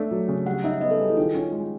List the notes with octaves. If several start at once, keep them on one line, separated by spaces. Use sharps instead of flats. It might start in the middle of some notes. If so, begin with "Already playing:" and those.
Already playing: A3 D4
F#3
C#3
G3 F#5
D#4 E5
B3 D#5
A4
G3 G#4
E4
D#3 F4
C#4
G#3